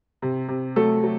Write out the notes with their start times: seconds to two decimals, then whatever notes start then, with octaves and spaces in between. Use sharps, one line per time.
0.22 C3
0.48 C3
0.76 F#3 A3 A4
1.03 F#3